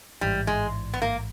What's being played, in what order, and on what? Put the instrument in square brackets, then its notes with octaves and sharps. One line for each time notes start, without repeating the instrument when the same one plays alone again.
[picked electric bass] A1 G#2 E3 [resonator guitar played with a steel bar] G3
[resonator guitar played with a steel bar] G#3
B3
A#3